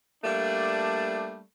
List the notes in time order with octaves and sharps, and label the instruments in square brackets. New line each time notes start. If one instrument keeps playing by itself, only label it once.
[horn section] G3 A3 A#3 D4